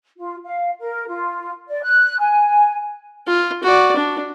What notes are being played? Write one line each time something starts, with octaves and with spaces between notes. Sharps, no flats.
F4
F5
A#4
F4
D5
F#6
G#5
F4
F#4 D5
D4